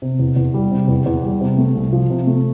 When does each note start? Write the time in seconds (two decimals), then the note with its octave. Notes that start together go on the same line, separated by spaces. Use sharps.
0.02 C3
0.19 E2
0.36 E2
0.54 G3
0.71 C3
0.88 E2
1.06 E2
1.23 G3
1.41 C3
1.58 A3
1.75 C2
1.93 F3
2.10 C3
2.27 A3